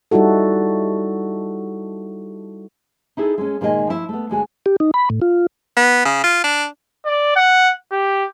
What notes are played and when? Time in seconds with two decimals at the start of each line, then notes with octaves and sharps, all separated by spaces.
0.11 G3 D#4 E4 F#4 A4
3.17 D#4 E4 G#4 A4
3.38 G#3 C#4
3.61 A#2 D#3 G#3 A#4 D#5 G#5
3.87 F3 E4
4.09 A3 B3
4.30 D2 G#3 F#4 G#5
4.66 G4
4.80 D#4
4.94 B5
5.10 A2
5.22 F4
5.77 B3
6.05 C#3
6.24 F4
6.44 D4
7.05 D5
7.36 F#5
7.92 G4